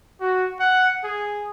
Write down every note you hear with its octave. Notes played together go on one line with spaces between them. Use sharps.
F#4
F#5
G#4